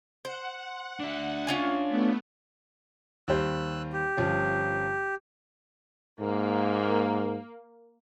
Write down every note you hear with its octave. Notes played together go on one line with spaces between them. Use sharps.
C5 F#5
D4 E5
C#4 F4 G#5
A3 B3
D#2 G3 C5 E6 F#6
G4
G1 F3 C#4
G#2 A#3